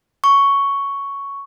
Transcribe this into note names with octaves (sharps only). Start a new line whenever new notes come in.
C#6